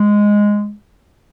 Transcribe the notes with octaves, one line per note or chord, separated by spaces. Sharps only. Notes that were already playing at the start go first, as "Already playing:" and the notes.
Already playing: G#3